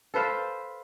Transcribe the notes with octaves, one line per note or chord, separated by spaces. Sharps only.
A4 B4 C5 F5